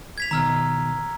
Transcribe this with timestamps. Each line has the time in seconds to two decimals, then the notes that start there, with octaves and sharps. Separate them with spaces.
0.18 G#6 B6 F7
0.31 B2 D#3 A#5 E6 F6